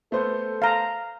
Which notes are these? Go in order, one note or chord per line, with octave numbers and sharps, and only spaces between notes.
A3 B3 A4 C5
F5 A#5